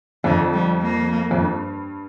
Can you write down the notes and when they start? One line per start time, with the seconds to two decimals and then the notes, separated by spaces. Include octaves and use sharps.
0.24 F2 D3
0.53 G3
0.82 A#3
1.31 F2
1.41 G2